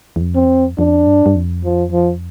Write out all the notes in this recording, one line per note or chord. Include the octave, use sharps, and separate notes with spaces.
E2
F2
C4
E2
F2
F2 D4
G2
G2
F2
F3
F3